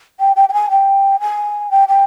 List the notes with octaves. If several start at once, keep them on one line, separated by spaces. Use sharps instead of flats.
G5
G5
G5
G#5
G5
G#5
G5
G5